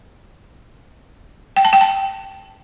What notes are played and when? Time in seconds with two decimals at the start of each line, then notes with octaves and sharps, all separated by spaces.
1.56 G5
1.65 A5
1.73 G5
1.81 A5